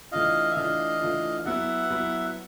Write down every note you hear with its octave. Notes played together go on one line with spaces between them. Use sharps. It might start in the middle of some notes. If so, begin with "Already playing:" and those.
E3 A3 D4 F4 D#5 F5
E5
E3 A3 D4 F4 D#5 F5
E3 A3 D4 F4
F#3 B3 E4 E5 F#5
F#3 B3 E4